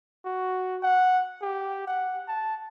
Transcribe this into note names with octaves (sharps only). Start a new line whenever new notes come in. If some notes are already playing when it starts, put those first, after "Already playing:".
F#4
F#5
G4
F#5
A5